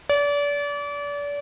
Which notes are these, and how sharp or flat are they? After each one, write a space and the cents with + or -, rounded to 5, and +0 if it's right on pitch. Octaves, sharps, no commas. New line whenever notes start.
D5 -35